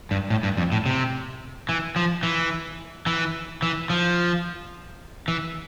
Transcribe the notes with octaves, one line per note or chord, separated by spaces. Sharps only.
G2
A2
G2
F2
A2
C3
E3
F3
E3
E3
E3
F3
E3